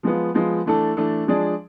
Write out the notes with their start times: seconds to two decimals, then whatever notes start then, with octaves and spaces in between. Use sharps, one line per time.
0.03 F3 G#3 B3 F4
0.34 F3 G#3 B3 F4
0.66 E3 A3 D4 A4
0.97 E3 A3 D4 A4
1.27 F3 G#3 D4 G#4 D5